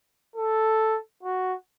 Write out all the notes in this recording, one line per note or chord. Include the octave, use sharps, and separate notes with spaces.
A4
F#4